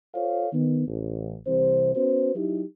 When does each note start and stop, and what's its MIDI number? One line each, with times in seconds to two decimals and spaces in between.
0.14 0.47 65
0.14 0.47 69
0.14 0.47 72
0.14 0.47 73
0.14 0.47 77
0.53 0.83 51
0.53 0.83 59
0.88 1.35 33
1.47 1.94 36
1.47 1.94 48
1.47 1.94 52
1.47 1.94 72
1.96 2.33 59
1.96 2.33 61
1.96 2.33 66
1.96 2.33 71
1.96 2.33 72
2.35 2.62 54
2.35 2.62 63
2.35 2.62 64
2.35 2.62 67